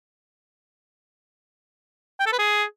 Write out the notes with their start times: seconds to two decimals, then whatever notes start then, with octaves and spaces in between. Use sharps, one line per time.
2.20 G5
2.26 A4
2.32 B4
2.39 G#4